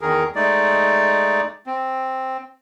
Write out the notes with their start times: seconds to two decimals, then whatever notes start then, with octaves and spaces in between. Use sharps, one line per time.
0.01 E2 D#3 G#4 A#4
0.35 G#3 A3 D#4 D5
1.67 C4